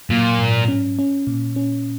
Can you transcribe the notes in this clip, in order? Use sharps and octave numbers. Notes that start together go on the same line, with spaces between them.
A#2 F#3
G#2
C#4
C#4
A#2
C#4